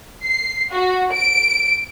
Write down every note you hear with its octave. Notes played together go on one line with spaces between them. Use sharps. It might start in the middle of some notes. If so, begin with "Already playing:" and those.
C7
F#4
D7